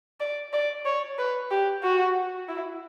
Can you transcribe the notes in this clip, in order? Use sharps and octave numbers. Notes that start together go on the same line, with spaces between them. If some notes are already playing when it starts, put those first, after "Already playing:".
D5
D5
C#5
B4
G4
F#4
E4